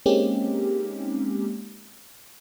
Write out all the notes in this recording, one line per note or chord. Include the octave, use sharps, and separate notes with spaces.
G#3 A#3 C4 C#4 D#4 G4